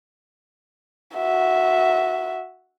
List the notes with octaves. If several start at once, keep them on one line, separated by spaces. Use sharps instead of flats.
F#4 E5